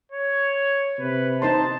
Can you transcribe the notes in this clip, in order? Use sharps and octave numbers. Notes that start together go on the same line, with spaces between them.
C#5
C3 B4
D#4 C5 A5 C6